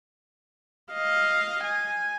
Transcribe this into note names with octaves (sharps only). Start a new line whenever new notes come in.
D#5 F5
G#5